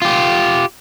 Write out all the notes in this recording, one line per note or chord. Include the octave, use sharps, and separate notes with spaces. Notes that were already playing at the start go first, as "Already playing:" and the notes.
F4 G4